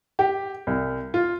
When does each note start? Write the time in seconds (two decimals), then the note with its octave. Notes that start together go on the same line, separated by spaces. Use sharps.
0.19 G4
0.67 C2
1.14 F4